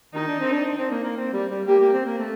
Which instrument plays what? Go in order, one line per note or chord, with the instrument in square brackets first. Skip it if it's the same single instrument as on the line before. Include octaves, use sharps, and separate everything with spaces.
[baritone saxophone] D#3 [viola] D#4
[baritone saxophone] D4
C4
D4
D4
C4
A#3
A#3
C4
G3
G3
[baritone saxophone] A#3 [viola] G4
[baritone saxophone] A#3
C4
A#3
A3